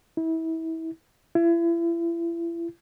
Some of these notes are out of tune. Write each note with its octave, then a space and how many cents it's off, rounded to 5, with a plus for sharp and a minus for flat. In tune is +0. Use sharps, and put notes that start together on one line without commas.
E4 -30
E4 +35